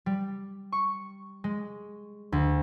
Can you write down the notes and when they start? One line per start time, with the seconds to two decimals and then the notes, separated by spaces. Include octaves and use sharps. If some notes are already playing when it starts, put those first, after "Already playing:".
0.06 G3
0.72 C#6
1.44 G#3
2.32 D2